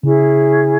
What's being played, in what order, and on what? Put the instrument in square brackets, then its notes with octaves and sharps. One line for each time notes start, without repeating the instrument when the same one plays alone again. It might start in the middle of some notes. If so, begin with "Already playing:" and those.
[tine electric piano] C#3 [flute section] C#4 E4 G#4